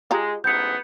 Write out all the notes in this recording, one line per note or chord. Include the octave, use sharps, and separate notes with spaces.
G#3 F4 G4 A#5
A1 G#2 B3 G6 C#7